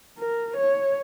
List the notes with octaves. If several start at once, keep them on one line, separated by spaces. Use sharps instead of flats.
A#4
C#5